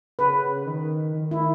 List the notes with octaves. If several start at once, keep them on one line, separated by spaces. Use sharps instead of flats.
C#3 B4
D#3
D#3
E4